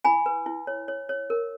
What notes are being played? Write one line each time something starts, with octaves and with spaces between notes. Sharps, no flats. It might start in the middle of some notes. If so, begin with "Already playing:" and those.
E4 G#5 B5
B4
E4
C#5
C#5
C#5
A#4